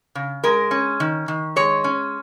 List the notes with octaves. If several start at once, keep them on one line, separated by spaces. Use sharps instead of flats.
C#3
G#3 A#4
C#4
D#3
D#3
G#3 C#5
C#4